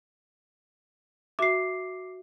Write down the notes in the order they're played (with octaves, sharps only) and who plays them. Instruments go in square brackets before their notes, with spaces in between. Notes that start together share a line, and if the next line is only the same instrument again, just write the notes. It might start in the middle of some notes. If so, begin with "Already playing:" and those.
[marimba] F#4 E5 [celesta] D6 C7